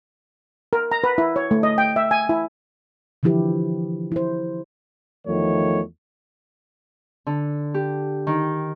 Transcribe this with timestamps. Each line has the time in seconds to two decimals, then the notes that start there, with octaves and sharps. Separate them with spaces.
0.73 A#4
0.92 A#5
1.04 B4
1.18 E4
1.36 C#5
1.51 A3
1.63 D#5
1.78 G5
1.96 E5
2.11 G#5
2.29 E4
3.23 D3 E3 F3 E4 G4 B4
4.12 E4 C5
5.26 E2 D#3 F3 A3 C#5
7.27 D3
7.74 G4
8.27 D#3